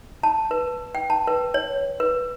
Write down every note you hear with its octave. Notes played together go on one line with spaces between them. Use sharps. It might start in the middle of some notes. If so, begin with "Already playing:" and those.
A5
B4
G5
A5
B4
C#5
B4